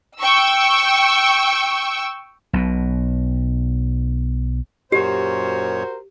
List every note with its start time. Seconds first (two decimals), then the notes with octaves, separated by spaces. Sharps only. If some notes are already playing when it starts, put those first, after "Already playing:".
0.19 G5 C#6 E6
2.53 B1 B2
4.92 F#2 A#2 F#4 G4 A#4 C5 C#5